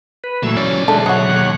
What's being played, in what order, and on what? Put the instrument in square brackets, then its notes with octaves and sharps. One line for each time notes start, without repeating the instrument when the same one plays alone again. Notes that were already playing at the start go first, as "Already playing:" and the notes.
[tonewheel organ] B4
[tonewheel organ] A#2 A3 E6 [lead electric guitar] E3 F#3
[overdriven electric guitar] B1 D5 [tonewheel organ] C#4
[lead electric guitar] D3 E5 [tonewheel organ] G#3 D4 [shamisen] A4
[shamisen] G#3 F#4 [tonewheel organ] C#5 F#5
[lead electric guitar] D#2